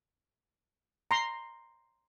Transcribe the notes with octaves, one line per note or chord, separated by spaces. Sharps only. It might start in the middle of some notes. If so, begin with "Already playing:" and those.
A#5 C6